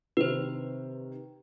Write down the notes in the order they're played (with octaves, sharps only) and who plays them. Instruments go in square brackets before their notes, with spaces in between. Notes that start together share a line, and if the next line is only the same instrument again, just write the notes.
[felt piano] C3 D#3 [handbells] B4 C5